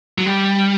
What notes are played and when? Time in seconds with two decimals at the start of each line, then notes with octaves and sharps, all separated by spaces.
0.18 F#3
0.26 G3